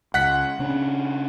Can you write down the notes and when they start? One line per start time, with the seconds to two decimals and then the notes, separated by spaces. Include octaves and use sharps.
0.14 C#2 F#5 F#6 B6
0.59 C#3 C#4 D4